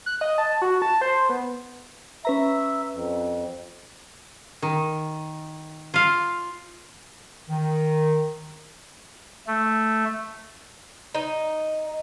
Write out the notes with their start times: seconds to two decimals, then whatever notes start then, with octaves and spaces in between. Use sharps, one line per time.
0.06 F#6
0.21 D#5
0.38 A5
0.62 F#4
0.82 A5
1.01 C5
1.29 B3
2.25 C#4 B4 E5 A#5
2.94 F2
4.62 D#3
5.94 F4 F5
7.50 D#3
9.47 A3
11.15 D#4